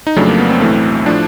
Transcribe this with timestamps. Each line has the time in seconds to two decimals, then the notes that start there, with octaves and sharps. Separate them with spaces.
0.07 D#4
0.16 F2 C#3 F#3 A3 D4
0.28 A#3
0.39 B3
0.50 C4
0.61 B1 A2 E3 A3
1.06 A2 F3 D4